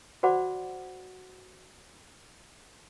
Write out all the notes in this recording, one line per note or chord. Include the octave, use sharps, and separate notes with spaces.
F#4 C5 D5 F#5 B5 D6